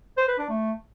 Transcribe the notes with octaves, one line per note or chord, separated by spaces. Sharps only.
C5
B4
D4
A3